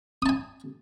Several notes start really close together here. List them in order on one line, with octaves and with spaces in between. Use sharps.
D#6 A5 G#5